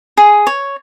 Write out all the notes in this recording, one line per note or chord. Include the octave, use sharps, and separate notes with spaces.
G#4
C#5